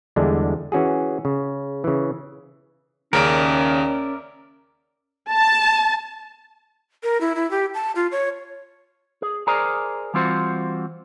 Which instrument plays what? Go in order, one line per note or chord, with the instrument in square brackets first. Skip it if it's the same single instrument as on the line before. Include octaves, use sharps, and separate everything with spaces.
[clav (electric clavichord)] E2 D3 G3 G#3 D4
E3 C#4 F#4 G#4
C#3
C#3 E3
[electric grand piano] D#2 C#3 D7 [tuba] C#4 [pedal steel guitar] A#4 D5 E5
[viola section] A5
[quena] A#4
E4
E4
G4
A5
F4
C#5
[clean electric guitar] G#4
G#4 A#4 C5 D5 G#5 A#5
E3 G3 C4 F4 F#4 C5